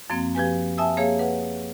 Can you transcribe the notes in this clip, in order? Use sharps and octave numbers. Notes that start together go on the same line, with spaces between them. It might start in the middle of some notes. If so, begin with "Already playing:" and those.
F#2 F3 A#3 C4
F3 G4 B4 G#5
E5 G#5 A5 D#6 E6
A#3 G#4 C#5 F5
B4 F#5